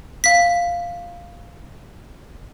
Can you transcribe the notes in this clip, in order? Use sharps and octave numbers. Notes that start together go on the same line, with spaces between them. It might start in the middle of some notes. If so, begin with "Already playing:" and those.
F5 B6